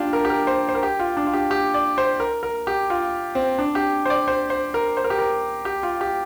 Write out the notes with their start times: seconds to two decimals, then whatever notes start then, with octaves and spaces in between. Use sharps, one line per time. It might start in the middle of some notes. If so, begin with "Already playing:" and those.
Already playing: D4 F4 G4
0.13 A#4
0.25 G4
0.30 A#4
0.47 C5
0.69 C5
0.75 A#4
0.83 G4
0.99 F4
1.17 D4
1.27 F4
1.33 G4
1.51 G4
1.74 D5
1.98 C5
2.20 A#4
2.43 A#4
2.67 G4
2.90 F4
3.35 C4
3.59 D4
3.75 G4
4.05 C5
4.10 D5
4.28 C5
4.50 C5
4.74 A#4
4.97 C5
5.04 A#4
5.10 G4
5.19 A#4
5.65 G4
5.83 F4
6.01 G4